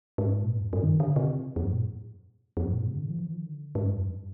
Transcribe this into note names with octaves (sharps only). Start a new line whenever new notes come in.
G#2
A#2
G#2
F2
G2
D#3
D3
C3
F2
G2
A#2
F2
G2
A#2
G#2
C3
D3
D#3
F3
D#3
F3
D#3
D3
G#2
G2
F2
G2